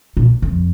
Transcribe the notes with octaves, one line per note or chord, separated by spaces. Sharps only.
A#2
F2